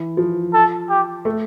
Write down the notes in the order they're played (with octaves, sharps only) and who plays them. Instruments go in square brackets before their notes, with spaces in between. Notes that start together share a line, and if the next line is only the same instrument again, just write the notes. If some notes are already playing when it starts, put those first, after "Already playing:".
Already playing: [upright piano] E3
F3
[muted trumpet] A4
G4
[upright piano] A3